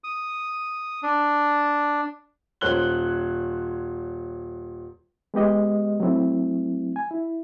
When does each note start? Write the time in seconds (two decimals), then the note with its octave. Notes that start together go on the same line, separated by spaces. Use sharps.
0.04 D#6
1.03 D4
2.61 D#1 C5 C#5 F#6 G7
5.34 G#3 B3 G4 D#5
6.00 F#3 A3 C4 E4
6.96 G#5
7.11 E4